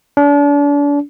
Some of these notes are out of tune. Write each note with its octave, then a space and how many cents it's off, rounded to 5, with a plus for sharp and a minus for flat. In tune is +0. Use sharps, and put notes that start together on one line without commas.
D4 -35